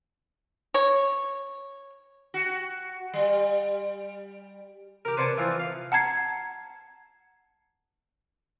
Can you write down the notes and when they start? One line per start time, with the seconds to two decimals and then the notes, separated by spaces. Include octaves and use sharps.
0.74 C#5
2.34 F#4
3.14 G3
5.05 G4 A#4
5.17 B4 C5 D5 F#5 G#5 A5
5.38 E3 F3
5.59 F5
5.92 F#5 A5 A#5 G#6 C7